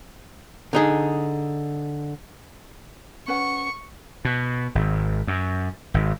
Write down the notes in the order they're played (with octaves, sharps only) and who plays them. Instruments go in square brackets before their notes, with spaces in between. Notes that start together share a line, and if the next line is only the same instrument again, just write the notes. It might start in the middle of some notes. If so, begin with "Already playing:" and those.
[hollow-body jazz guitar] D3 D#4 G#4
[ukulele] C#4 B4 F#5 [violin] C#6
[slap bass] B2
G#1
F#2
G#1